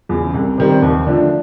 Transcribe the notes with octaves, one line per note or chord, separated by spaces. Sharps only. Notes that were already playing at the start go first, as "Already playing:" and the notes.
E2 C#3
C2
C3 D#3 G3 C4
D#2
D3 F3 A3 D4